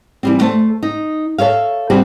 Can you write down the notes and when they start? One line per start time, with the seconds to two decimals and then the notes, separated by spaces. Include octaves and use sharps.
0.23 E3 G3 C4
0.41 A3 C5 A5
0.83 D#4
1.38 A4 C#5 E5 F5
1.90 G3 C4 D4 F#4 G4